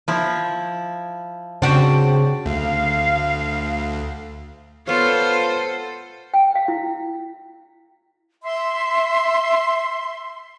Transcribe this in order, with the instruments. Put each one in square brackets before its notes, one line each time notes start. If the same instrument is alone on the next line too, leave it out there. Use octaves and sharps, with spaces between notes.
[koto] F3 E4
[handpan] C#3 [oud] C4 F#4 [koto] D4 G4
[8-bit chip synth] D2 [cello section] F5
[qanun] B3 C#5 [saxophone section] F4 [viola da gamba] A4 C5
[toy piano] G5
F5
E4
[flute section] E5 C6